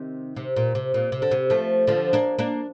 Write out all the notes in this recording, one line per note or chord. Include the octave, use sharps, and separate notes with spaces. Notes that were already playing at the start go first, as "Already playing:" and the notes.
Already playing: C3 D#3
C3
A#2
C3
A#2
C3
D3
C3
F3 A3
D3 F3
A#3 D4
A#3 D4